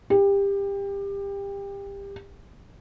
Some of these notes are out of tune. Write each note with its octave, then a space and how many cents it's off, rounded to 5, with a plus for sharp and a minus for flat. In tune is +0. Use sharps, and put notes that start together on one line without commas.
G4 +25